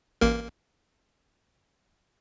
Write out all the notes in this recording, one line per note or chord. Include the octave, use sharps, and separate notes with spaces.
A1 A#3 A#4